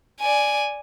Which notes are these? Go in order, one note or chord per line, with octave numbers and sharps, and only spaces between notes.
D5 G#5